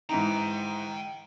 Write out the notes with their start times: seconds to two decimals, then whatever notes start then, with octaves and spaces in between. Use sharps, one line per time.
0.09 G#2 E3 D#4 G5 A#5